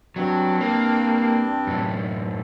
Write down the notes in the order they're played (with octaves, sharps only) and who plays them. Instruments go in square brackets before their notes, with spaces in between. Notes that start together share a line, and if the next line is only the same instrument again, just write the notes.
[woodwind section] G2 C4 D4 [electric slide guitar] F#3
[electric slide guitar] A#3
F#2 A2